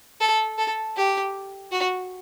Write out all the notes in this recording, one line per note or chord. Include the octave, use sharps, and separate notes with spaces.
A4
A4
G4
F#4